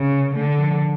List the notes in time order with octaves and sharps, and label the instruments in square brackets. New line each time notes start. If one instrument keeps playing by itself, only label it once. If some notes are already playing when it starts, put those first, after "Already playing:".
Already playing: [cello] C#3
[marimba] C3
[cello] D3 [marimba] A3
[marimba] F3